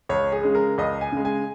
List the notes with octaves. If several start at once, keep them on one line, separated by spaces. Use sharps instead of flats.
C#2 C#5
G#4
C#3 G#3
A#4
C#2 D#5
G#5
C#3 G#3
G#5